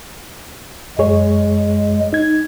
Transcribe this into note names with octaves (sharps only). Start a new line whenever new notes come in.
F#2 G#3 G#4 C#5
D#4 G#6